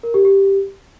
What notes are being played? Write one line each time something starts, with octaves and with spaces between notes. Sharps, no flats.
A#4
G4
G4